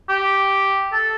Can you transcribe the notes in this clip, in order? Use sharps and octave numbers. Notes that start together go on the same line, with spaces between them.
G4
A4